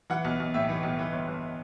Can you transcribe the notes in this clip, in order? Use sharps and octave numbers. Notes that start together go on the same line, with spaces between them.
E3 F#5
B1
B1
A2 E5
E3
B1
E3
G1
G1